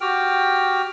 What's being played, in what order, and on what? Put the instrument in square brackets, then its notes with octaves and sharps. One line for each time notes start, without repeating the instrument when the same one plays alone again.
[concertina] F#4 G4 G5 F6